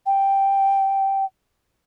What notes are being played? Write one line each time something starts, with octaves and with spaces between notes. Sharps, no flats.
G5